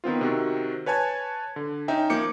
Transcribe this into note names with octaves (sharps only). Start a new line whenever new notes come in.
D#3 B3 C4 F4
C3 D#3 C4 F#4
B4 C#5 G#5 A5 G#6
D3
C#4 D#4 E5 G5
F3 A#3 D6 G6 C#7